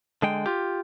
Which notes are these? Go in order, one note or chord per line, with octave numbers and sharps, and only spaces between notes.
D3 G#3 G5
F4 G4